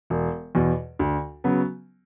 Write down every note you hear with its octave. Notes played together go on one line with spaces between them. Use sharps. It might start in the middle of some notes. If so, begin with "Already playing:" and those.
E1
E2 B2
D2
C#3 F#3 B3